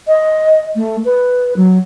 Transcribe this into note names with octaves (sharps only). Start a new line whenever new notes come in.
D#5
A3
B4
F#3